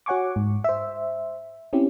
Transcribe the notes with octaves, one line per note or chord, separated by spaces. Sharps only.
F#4 C#5 F#5 G#5 C#6 D6
G#2
C5 E5
C4 C#4 E4 G4